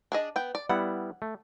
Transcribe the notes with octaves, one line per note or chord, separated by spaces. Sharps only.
D4 G#4 D#5
B3 G5
D5
G3 B3 E4 F#5
A3